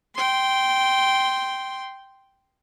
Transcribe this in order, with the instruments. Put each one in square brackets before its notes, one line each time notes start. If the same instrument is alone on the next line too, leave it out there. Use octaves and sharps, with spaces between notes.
[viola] G5 C6